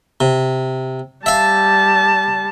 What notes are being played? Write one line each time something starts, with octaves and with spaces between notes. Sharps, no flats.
C3
G3 E5 F5 A5